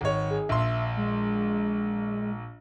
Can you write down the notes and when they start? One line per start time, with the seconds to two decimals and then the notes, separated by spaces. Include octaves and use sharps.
0.01 G#1 C#5
0.30 G#4
0.49 A#1 E5 C6
0.97 G#3